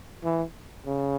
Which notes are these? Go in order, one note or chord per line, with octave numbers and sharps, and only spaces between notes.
E3
C#3